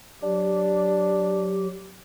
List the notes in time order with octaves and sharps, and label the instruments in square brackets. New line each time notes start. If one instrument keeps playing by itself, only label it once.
[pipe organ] F#3 G4 [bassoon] D4